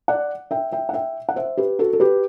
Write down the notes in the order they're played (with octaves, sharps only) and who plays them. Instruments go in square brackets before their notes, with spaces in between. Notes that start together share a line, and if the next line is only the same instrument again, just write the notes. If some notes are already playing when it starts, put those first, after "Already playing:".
[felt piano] D5 F#5
E5 G5
E5 G5
F#5
E5 G5
F#5
C5 E5
G4 B4
F#4 A4
A4
G4 B4